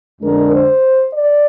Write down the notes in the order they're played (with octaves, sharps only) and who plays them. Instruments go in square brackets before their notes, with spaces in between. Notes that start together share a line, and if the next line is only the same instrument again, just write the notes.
[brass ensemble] F2 D3 G#3 D4 A#4
C5
D5